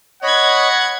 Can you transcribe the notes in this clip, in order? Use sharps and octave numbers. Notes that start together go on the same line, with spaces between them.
C#5 D#5 F#5 B5 G#6